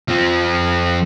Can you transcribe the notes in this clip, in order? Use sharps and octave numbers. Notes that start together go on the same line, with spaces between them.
F3 C4